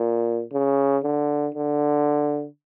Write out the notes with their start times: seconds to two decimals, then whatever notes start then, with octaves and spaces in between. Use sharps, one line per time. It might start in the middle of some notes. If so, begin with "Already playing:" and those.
Already playing: A#2
0.52 C#3
1.03 D3
1.54 D3